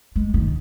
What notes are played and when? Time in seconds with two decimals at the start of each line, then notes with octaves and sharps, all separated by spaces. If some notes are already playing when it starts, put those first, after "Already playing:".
0.16 G#3
0.34 D#3